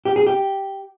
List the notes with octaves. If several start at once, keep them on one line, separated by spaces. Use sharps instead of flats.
G4
G#4
G4